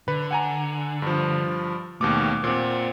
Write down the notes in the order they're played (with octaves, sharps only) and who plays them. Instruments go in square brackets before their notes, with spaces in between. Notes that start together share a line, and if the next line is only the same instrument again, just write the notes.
[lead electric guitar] D3 [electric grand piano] B4
[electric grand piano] F#5 G#5 A#5
G2 F3
[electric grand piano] D#2 B2 D6 [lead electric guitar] A3 G4
[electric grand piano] A#2 C4 [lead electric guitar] C5 F#5